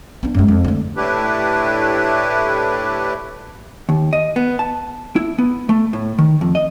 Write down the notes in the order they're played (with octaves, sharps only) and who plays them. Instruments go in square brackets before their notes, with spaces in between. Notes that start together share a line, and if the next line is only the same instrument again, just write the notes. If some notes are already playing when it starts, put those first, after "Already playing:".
[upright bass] B3 D4
F#2 G#3
F2
D3 A3
[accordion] A2 A3 D4 E4 G4 B4
[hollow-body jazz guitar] D#2
D#5
B3
A5
E4
B3
A3
A2
D#3
F2
D#5